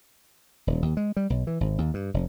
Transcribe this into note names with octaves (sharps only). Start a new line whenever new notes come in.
D#1
D#2
G#3
G3
B1
E3
G#1
D#2
G2
F1